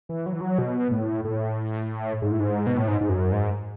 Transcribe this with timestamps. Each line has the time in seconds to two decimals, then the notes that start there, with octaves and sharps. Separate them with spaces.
0.09 E3
0.26 F#3
0.33 E3
0.41 F#3
0.58 B2
0.91 A2
1.25 A2
2.22 G#2
2.32 A2
2.40 G#2
2.67 B2
2.77 A2
2.88 G#2
3.01 G#2
3.09 F#2
3.32 G#2